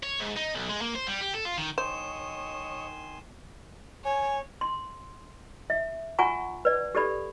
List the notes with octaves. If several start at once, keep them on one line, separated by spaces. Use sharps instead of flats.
C#5
G#2
D#4
B1
G#3
A#3
C5
G3
G4
A4
F4
D#3
D#3 C5 C#5 D#5 G#5 C6 E7
C#5 G#5
C6
E5
F4 F#5 G#5 A#5 C#6
B4 D5
G4 A4 D5 B5